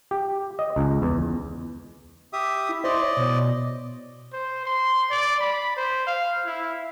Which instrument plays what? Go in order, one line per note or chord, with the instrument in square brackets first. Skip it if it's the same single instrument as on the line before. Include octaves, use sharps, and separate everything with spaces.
[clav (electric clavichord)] G4
D#5
C#2
E2
[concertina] G4 E5 D#6
[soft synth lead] E4
[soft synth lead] C5 [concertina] D5 D#5
[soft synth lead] C#5
B2
[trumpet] C5
C6
D5
B5
C5
F5
E4